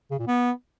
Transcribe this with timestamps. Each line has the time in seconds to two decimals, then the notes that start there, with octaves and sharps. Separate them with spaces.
0.11 C#3
0.19 A#2
0.27 B3